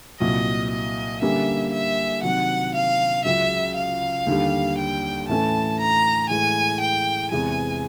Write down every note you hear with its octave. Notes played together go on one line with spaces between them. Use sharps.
C2 A#2 F#3 D#5
D#5
D3 G3 A#3 C#4 E5
E5
C3 D#3 F#3 F#5
F5
C#2 C#3 F#3 E5
F5
D#2 D3 G3
G5
A2 E3 A3 C#4 A5
A#5
A2 E3 G#3 G#5
G5
E2 C3 E3 G#3 G#5